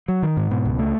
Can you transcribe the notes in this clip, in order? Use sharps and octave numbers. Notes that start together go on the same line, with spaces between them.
F#3
D#3
G#2
B2
C#2
A3